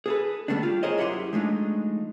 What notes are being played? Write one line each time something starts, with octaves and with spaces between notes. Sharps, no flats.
G#4 A4 B4
D3 D#3 G3 A3 B3 D4
F4 G4
G#4 A#4 C5 C#5 D#5
F#2 E4 G4 F#5 B5 C6
F3 G#3 A3 D4 D#4